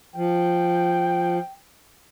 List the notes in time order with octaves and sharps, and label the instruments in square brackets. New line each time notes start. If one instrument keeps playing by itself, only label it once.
[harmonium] F3 [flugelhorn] G5